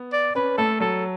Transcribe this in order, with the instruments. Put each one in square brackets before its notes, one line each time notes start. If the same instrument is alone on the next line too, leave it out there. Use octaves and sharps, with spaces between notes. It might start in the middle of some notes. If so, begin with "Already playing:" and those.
Already playing: [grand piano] B3
[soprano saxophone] D5
[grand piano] C#4 [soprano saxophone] B4
[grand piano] A3 [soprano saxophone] A4
[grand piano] F#3 [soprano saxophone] A4